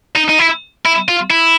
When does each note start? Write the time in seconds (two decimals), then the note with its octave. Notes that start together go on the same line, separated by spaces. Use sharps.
0.15 D#4
0.29 D#4
0.39 E4
0.85 E4
1.09 F4
1.31 E4